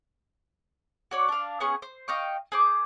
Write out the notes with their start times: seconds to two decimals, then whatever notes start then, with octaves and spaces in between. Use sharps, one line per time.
1.11 F#4 C#5 D5
1.28 D4 F5
1.60 B3 C#4 G#4 C#6
1.82 C5
2.08 D#5 F5 G5 C#6
2.52 G#4 C5 D6